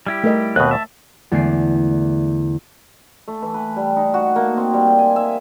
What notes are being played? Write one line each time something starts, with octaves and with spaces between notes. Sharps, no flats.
G3 E4 G4
A3 A#4 D#5
D#2 B2 C4 B4 F#6
E5 A5
E2 D3 A3 D5 G#5 C7
A3
E3
B4
G3
D#4
F#4
A#3
C4
G3
G5
G#5
E5